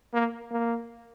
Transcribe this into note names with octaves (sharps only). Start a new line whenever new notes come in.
A#3
A#3